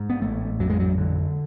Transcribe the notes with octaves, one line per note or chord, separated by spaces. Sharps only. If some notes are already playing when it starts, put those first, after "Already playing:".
Already playing: G#2
B3
A1 A3
F2 F#3
G#3
F#3
D3